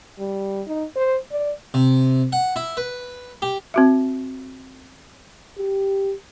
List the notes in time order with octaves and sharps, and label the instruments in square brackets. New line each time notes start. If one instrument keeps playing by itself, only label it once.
[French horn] G3
D#4
C5
D5
[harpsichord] C3
F#5
E4
B4
G4
[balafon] C4 F#4 E5
[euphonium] G4